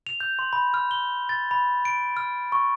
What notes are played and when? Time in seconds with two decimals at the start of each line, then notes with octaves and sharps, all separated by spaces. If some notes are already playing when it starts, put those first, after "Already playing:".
0.07 F7
0.20 G6
0.39 C6
0.53 B5
0.74 F6
0.91 G7
1.29 A6
1.51 B5
1.85 D7
2.17 F6
2.52 C#6